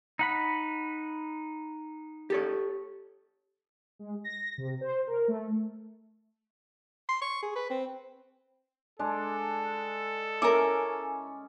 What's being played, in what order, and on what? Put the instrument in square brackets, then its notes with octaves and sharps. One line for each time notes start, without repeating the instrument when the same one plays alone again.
[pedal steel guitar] D#4 F#5 B5
[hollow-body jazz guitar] G4 A4 C#5
[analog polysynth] G#3
A#6
C3
C5
A#4
A3
[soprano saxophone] C6
C#6
G#4
B4
C4
[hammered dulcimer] G#3 D4 [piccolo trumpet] A4
[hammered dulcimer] C#4 [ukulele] E4 A#4 [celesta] D6